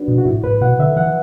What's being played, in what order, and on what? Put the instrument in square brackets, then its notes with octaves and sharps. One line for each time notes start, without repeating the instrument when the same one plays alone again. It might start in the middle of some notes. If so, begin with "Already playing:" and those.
Already playing: [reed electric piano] D4 F#4 B4
[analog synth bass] B2
[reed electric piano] F#4
[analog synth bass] A2 [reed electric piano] E4
[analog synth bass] A2 [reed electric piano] B4
[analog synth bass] B2 [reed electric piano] F#5
[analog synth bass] D3 [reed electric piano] E5
[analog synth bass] E3 [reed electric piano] F#5